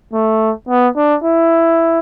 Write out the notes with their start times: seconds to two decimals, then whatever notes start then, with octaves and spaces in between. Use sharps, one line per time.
0.13 A3
0.69 B3
0.96 D4
1.24 E4